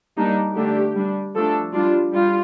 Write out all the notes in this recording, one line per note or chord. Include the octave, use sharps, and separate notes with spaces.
G3 A#3 D4 D#4
D3 A3 D4 G4
G3 D4
F3 A3 D4 A4
G3 D4 F4
G3 F4